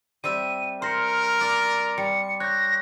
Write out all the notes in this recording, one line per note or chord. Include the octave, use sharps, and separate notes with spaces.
G3 C4 E5 D#7
A#4 C5 C6 F6 A#6 C#7
D5 D6
G3 C#7
C#5 F#6 G6 A#6